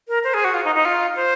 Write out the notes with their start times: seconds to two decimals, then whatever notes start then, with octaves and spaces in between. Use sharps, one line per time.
0.08 A#4
0.24 C5
0.34 G#4
0.44 F#4
0.54 F4
0.65 D#4
0.75 D#4
0.85 F4
1.16 C5